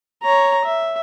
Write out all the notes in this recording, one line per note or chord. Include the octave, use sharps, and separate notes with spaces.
C#5 A#5
E5